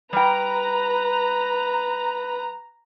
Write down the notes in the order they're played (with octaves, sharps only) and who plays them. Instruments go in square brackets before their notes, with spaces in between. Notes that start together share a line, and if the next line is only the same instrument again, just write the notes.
[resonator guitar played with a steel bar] G3 G5 [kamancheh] B4 [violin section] A#5